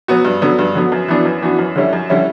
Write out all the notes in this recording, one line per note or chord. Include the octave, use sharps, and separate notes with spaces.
F#3 B3 F#4
G2
D3 F#3 B3
G2
D3 F#3 B3
F#2
E3 B3 D4 F#4
F#2
E3 B3 D4 F#4
F#2
D3 G3 C#4 E4
F#2
D3 G3 C#4 E4